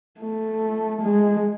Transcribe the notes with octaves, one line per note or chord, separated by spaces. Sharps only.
A3
G#3